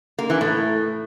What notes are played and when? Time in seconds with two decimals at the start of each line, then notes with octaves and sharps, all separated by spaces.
0.19 A#3
0.30 E3
0.41 A2